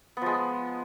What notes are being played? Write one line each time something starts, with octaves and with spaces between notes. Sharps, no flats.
F3 G#3 B3